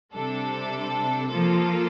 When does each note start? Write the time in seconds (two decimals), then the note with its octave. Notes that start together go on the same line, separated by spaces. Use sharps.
0.13 C3 G3 D4 A4
1.29 F3 A#3 F4 A4